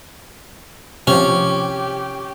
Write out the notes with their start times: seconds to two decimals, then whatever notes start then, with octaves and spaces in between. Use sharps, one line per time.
1.07 C3 F3 C#4 G4